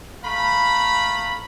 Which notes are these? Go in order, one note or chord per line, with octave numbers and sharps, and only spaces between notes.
A3 F5 A#5 B5